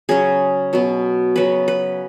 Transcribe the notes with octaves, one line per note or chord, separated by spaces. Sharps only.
C#3 F#3 C#4 G#4
B2 F#3 B3
C#3 F#3 B3 B4
B4